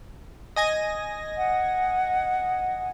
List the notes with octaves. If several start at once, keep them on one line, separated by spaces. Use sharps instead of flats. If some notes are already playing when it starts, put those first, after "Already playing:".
D#5 G#5 A#6
F#5